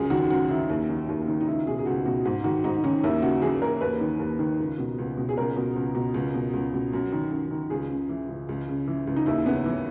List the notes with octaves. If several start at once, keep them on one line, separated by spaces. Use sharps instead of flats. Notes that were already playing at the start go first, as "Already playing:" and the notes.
Already playing: C#2 F#2 G#4
D#3 F#4
F#2 F#4
D#3 E4
D#2
D#3
D#2
D#3
D#4
C#2 E4
B2 G#4
G#4
C#2 F#4
B2 F#4
G#2
D#3 F#4
G#2 D#4
D#3 C#4
D#2 E4
C#3 F#4
E3 G#4
D#2 A#4
D#2 B4
D#3
D#2
D#3
C#2
B2
C#2
B2
G#4
C#2 A#4
B2
C#2
B2
C#2
B2
C#2
B2
F#2
D#3
F#2
D#3
C#2 G#4
C#3
E3
C#2
C#2
C#3
E3
C#2
D#4
D#2 E4
C#3 B3
C#4
E3